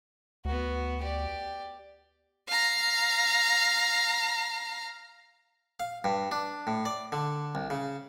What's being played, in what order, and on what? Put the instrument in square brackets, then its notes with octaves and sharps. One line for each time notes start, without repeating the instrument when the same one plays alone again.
[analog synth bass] D2 [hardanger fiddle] B3 F#4
[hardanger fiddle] G4 D5
[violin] F5 A#5
[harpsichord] F5
G2
D4
A2
D5
D3
C2
C#3